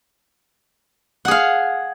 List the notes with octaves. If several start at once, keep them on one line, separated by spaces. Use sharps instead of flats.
G#4 F5 F#5